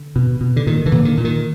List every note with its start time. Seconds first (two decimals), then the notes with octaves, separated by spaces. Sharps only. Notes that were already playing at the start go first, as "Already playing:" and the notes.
Already playing: D3
0.16 B2
0.41 B2
0.56 D3
0.67 A#2 D#3
0.86 D3 E3
0.92 A#2
1.05 D#3
1.18 A#2
1.25 D#3